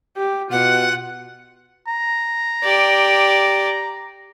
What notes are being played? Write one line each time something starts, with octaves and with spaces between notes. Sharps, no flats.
G4
B2 F4 F#5
A#5
G4 D5